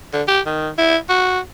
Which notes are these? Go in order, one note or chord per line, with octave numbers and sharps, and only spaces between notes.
D3
G4
D#3
E4
F#4